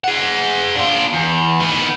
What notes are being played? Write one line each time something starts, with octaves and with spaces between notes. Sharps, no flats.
G#4 F#5
D4 F4
E2
D#3 B3